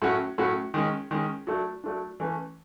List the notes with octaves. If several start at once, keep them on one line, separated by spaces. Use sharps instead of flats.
A2 F#3 A3 C#4 F#4
A2 F#3 A3 C#4 F#4
D#3 G#3 C#4
D#3 G#3 C#4
F#3 A3 D4
F#3 A3 D4
E3 A3 C#4